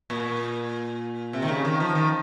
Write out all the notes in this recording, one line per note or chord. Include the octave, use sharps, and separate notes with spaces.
A#2
C3
D#3
C#3
D#3
F3
D#3